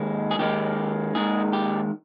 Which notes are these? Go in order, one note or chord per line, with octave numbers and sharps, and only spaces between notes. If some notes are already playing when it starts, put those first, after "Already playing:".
Already playing: D#2 D#3 G#3
G#4
D#2 D#3 G#3 G4
D#2 D#3 G#3 G#4
G4